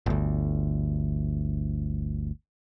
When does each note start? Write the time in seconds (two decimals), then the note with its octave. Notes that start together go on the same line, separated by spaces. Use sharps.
0.06 G1 D2